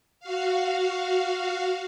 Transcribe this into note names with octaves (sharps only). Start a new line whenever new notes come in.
F#4 F5